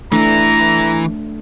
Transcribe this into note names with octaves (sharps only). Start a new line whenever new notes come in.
E3 A3 D4 E4 A#5